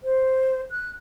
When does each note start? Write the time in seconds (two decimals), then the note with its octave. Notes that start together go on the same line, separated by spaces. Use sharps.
0.04 C5
0.71 F#6